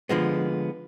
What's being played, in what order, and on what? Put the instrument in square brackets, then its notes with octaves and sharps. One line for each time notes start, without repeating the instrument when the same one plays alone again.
[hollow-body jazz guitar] D3 F3 G#3 B3